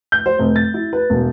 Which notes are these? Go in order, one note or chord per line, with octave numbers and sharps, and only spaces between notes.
G6
C5
F1
A6
E4
B4
E1